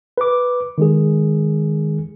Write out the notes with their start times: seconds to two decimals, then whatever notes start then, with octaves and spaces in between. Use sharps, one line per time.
0.17 B4 D6
0.78 D#3 G#3 G#4